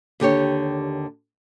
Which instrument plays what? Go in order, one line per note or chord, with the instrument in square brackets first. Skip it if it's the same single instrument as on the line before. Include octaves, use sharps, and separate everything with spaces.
[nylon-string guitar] D#2 D3 G4 C#5